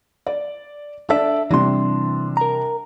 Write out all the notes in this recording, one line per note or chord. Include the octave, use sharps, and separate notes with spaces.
D5
D4 A4 D5 E5
C3 E3 G3 D4 C6
A#4 A#5